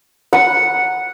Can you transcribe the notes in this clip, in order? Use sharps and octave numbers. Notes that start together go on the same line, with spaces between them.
F#5